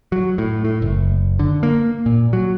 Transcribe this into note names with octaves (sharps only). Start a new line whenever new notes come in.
F#3
A2
A2
F#1
D3
A#3
A#2
F#3